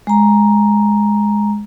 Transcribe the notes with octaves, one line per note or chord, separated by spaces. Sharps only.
G#3 A#5